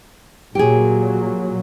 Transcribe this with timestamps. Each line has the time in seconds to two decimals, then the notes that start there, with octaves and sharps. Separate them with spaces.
0.55 A#2 F#3 G4 G#4